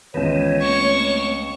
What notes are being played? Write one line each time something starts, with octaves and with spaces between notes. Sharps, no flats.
C#2 D#3 E3 B3 C#5
A3 A#3 C4 C#6